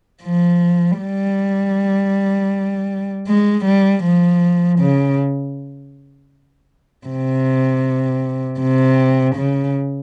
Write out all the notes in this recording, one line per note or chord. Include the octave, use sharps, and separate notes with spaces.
F3
G3
G#3
G3
F3
C#3
C3
C3
C#3